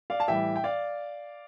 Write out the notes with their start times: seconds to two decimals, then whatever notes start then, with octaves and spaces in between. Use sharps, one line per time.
0.10 D5 F5
0.20 A5
0.28 A2 E3 G3 E5 G5
0.56 G5
0.64 D5 F5